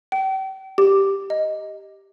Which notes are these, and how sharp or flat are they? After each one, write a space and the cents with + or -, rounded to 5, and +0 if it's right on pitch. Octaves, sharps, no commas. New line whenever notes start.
G5 -35
G4 +0
D#5 +5